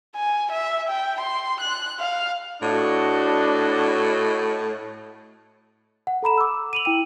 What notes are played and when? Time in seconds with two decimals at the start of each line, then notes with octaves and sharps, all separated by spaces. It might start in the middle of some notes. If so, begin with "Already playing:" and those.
0.16 G#5
0.52 E5
0.89 G5
1.21 C6
1.61 F#6
2.00 F5
2.62 A2 D4 F#4 D#5
6.07 F#5
6.23 A4 A#5 B5 E7
6.38 D6 E6
6.73 D#7 F7 F#7
6.85 E4 G5 D#7